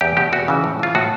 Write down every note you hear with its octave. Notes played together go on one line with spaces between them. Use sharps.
E2 G4
B2 G4
E2 F#4
C#3 E3
A2
E3 F4
A2 F#4